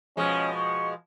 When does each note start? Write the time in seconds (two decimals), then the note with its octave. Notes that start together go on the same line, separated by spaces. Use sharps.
0.17 B2 F3 G#3 C#4
0.54 C#6